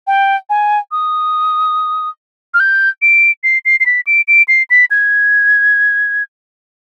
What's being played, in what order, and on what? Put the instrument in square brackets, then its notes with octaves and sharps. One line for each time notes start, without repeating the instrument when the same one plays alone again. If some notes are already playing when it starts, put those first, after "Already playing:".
[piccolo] G5
G#5
D#6
F6
G6
D7
C7
C7
C7
B6
D7
D7
C7
B6
G#6